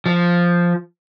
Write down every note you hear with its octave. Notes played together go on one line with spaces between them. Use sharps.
F3